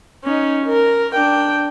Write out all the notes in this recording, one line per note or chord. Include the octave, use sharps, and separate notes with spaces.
C#4 D#4
A#4
D4 G5